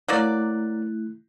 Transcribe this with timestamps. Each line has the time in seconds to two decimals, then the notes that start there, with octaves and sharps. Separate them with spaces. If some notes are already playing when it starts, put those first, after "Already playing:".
0.08 F#3 A3 A#3 E4 D5 F#6